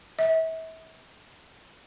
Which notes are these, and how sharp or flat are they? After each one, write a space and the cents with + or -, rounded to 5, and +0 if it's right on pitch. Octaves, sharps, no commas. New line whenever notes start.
E5 -35